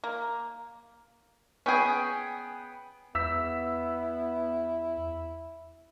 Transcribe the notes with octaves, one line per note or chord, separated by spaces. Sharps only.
A#3
B3 C#4 G#4 G5 G#5
E2 B3 E4 E6 B6